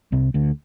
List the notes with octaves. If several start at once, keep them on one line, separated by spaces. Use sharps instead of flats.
C2 C3
D2 D3